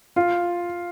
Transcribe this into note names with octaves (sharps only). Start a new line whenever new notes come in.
F4